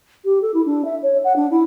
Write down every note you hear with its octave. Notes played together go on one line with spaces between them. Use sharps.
G4
A4
E4
D4
E5
C#5
F#5
D4
E4